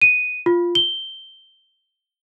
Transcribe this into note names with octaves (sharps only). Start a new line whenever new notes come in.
D#7
F4
G7